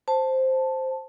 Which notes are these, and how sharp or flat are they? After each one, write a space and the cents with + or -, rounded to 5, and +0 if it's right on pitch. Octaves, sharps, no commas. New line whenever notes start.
C5 +0 A5 +0